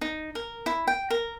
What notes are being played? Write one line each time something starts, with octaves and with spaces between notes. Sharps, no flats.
D#4
A#4
E4
G5
A#4